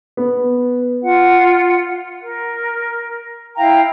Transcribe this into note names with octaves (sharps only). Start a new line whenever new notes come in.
B3
F4 F#5
A#4
E4 F5 G5 A#5